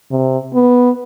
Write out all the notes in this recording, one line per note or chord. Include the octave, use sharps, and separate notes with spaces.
C3
B3